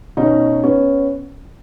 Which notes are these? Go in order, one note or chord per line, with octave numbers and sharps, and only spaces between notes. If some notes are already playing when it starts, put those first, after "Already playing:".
B2 C#4 D#4
B3 C#4